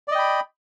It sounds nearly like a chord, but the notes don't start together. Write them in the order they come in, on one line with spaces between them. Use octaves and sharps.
D5 D#5 G5 B5